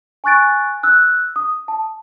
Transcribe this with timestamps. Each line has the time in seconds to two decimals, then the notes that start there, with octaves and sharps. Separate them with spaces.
0.24 G#5 C#6 F#6 A6 D7
0.83 E6 F#6
1.36 D#6
1.68 A5